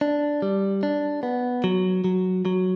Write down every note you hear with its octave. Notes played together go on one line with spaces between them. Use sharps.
D4
G3
D4
B3
F#3
F#3
F#3